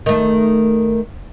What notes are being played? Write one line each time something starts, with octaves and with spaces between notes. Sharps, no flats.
D#3 A3